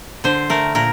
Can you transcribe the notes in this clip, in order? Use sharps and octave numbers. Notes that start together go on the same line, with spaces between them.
D3 C5
A3 A#4
A#2 A#4